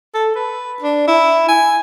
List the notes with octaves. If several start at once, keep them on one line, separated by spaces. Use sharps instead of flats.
A4
B4
D4
E4
G#5